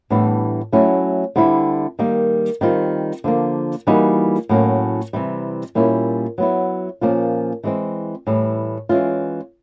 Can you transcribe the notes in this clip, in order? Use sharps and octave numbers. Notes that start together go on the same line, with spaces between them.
A2 E3 G3 B3 D4
F#3 A3 C#4 E4
D3 G3 C4 E4
D#3 G3 A#3
D#3 G3 C4 F4
D3 F3 A#3
E3 G3 A#3 D#4 F#4
A2 F#3 A#3 C#4
C3 E3 G3
A#2 G3 A#3 C#4 E4
F#3 B3 E4
A#2 F3 A#3 C#4 F4
E3 G#3 C4
A2 E3 G3
E3 G#3 C#4 F4